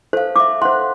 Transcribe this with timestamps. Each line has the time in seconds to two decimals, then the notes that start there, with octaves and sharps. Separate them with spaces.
0.13 A4 C5 F5
0.36 A4 E5 D6
0.62 C5 F5 F#5 C6 F#6